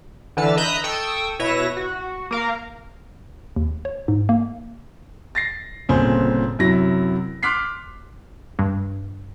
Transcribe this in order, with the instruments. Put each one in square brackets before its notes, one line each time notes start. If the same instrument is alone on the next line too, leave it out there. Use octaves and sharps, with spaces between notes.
[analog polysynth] D3 E3 B4 A5 E6 F6
D#5 E5 A#5 B5 F#6 G6
A4 G5 C#6 D#6 E6
B2 E4 B4 C#5 E5 A#6
F#4
A#3 A#4 F5
[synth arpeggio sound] D#2
C#5
G#2
A#3
[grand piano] A6 A#6 C7
G1 A#2 C#3 C4 C5 G#5
F#2 C3 F#3 E4 A#6
C6 D6 F6 F#6 B6 C7
[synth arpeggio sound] G2